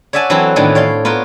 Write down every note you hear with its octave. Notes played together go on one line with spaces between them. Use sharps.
C#5 D5 E5 F#5 G#5 A5
E3 F#3 C4 E4 F#4 A4
A2 D#3 E3 B3 D4
C#5 D5 F5 C6
B3 F4 A#4 B4 C#5